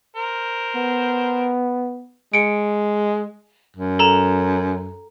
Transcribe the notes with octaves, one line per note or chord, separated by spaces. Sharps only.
A#4 C5
B3
G#3 C#7 D7
F#2
A4 A#5 E7